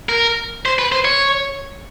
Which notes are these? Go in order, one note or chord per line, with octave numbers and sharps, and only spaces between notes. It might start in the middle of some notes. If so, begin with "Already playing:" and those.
A#4
C5
B4
C5
C#5